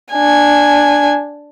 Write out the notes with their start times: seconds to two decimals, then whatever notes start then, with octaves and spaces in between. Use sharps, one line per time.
0.13 D4 G#5